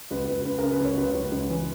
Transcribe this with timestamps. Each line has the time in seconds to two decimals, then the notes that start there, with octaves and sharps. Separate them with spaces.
0.11 C#2 B4
0.28 C#2 B4
0.45 C#3 B4
0.58 A#4
0.63 C#3
0.72 B4
0.80 C#2 C#5
0.97 C#2 B4
1.14 C#2
1.31 C#2
1.49 E3